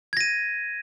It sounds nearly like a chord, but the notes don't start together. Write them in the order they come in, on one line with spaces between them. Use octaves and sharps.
G#6 A#6 D#7